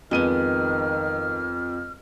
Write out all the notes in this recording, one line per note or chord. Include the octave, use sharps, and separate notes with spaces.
F2 D#3 G#3 B3 F6 D#7